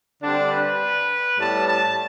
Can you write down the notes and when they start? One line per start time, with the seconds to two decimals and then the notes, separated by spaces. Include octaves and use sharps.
0.22 D3 G3 C4 D4
0.52 B4
1.39 A2 G3 B3 A5
1.68 A5